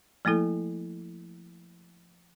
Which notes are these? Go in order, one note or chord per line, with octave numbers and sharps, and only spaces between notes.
F3 A3 A#3 E4 A4